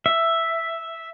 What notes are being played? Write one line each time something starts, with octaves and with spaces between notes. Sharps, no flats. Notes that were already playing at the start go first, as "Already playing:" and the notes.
E5